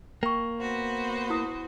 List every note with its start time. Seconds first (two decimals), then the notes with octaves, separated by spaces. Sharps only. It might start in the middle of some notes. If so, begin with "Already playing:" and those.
0.23 A#3 G5 C#6
0.58 B3 F#4 C5
1.30 E4 D#6